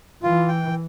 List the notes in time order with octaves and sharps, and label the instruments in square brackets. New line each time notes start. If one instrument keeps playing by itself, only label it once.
[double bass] E3 [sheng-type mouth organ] F4
[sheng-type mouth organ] G5